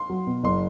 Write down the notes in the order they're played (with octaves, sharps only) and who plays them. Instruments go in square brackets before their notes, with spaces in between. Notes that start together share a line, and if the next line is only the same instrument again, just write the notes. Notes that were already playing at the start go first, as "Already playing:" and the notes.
Already playing: [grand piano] C6
[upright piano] F#3
B2
[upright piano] F#1 [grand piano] C6